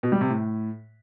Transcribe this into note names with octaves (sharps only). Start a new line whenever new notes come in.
B2
G3
C3
A2